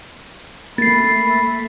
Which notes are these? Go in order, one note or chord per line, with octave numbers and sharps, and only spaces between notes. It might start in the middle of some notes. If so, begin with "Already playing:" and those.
A3 A#3 B5 A6 C7